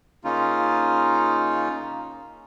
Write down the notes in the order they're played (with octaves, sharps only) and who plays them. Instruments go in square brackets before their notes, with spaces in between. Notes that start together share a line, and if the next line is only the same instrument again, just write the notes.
[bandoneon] C#3 A#3 C#4 D#4 F4